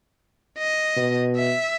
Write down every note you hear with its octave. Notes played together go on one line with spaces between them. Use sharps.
D#5
B2
E5